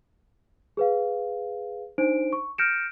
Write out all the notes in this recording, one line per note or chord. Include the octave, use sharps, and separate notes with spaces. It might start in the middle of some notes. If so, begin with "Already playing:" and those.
G#4 B4 F5
D4 D#4 C5 D7
C#6
F6 G6 A#6 C#7 D7 E7